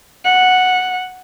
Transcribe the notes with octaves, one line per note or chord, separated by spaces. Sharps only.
F#5